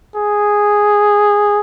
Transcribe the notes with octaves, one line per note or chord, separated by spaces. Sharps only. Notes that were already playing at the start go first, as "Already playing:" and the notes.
G#4